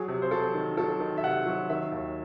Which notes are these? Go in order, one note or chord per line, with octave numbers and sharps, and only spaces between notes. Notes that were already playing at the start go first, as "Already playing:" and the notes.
Already playing: F#3 G#4
C3
C5
F#3 A4
D#3
F#3 A4
D#3
E5
C3 F#5
F#3
D#3 E5
D#2